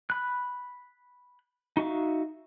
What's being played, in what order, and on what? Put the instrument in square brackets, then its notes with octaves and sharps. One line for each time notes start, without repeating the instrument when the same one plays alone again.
[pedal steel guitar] B5 F#6
D#4 F#4 E5 F5